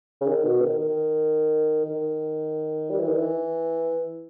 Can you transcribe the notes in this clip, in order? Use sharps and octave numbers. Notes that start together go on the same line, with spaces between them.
C#3
D#3
B2
D#3
D#3
D#3
G3
E3
D#3
E3